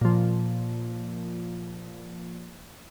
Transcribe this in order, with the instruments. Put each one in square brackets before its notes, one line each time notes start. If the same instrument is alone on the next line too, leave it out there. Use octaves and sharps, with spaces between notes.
[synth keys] A#2 F3